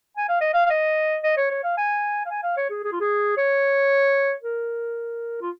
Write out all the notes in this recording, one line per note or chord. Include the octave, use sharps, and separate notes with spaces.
G#5
F5
D#5
F5
F5
D#5
D#5
C#5
C#5
F5
G#5
F5
G#5
F5
C#5
G#4
G#4
F4
G#4
C#5
A#4
F4